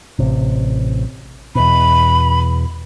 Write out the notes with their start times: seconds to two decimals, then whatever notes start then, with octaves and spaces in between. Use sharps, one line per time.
0.19 A1 C3
1.55 E2 B2 B5